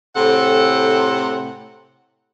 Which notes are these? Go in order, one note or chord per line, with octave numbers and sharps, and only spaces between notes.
A2 C3 C4 A4 F#5